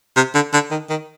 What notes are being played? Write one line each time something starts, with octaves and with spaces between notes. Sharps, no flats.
C3
D3
D3
D#3
D#3